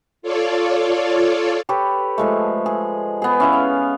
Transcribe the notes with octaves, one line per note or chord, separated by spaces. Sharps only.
F4 A4 C#5 D5
G4 A4 B4 C#5
F3 G#3 A3
G#4
B3 G#4
C#4 E4 F5
F5